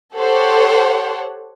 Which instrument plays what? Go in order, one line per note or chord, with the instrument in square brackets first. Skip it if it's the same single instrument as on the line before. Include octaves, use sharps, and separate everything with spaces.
[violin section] G4 A4 C5 C#5 F#5